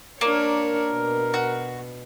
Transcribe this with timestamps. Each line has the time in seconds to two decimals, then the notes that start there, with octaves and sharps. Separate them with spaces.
0.21 A#3 D4 A#4 C#5
0.93 B2
1.34 F#4